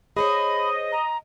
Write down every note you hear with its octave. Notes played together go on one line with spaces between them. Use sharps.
G#4 C5 C#5 D#5 B5
A#5